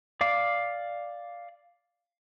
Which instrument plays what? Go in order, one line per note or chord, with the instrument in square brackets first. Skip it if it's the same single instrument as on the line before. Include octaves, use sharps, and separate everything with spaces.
[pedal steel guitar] D5 F5 D6